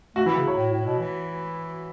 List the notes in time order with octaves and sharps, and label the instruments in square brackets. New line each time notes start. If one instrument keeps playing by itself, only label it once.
[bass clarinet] A3 [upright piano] F#4
[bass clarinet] E3 [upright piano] E4
[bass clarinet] C#3
[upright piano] C#5
[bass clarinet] A2
A2
B2
E3